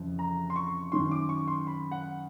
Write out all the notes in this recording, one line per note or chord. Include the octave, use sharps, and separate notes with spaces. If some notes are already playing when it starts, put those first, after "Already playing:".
Already playing: F2 C#3 E3
A#5
C6
C#6
F#2 D#3 C6
D6
C#6
C6
B5
F#5